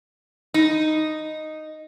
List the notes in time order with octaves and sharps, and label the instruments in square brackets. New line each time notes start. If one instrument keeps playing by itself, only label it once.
[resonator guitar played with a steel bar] D#4